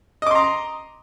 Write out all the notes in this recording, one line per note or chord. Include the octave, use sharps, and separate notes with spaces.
D#5 A#5 C6 D6